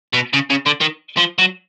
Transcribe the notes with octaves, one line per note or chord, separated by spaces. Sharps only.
B2
C#3
C#3
D3
D#3
F3
F#3